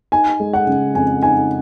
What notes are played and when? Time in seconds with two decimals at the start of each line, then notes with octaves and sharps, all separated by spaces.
0.12 D#4 G#5
0.40 G#3
0.53 F#5
0.67 C#3
0.94 F2 G#5
1.23 D#4 G#5